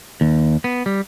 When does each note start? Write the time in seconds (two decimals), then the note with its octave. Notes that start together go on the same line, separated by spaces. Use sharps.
0.21 D#2
0.64 B3
0.86 G3